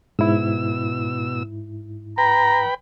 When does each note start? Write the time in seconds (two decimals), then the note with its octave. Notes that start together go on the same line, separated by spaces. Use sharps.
0.19 G#2 B2 E4 E6
2.18 B4 G5 A#5 B5